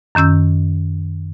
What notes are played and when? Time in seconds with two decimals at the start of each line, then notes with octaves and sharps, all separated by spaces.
0.15 F#2 D#3 C#4 E6 G6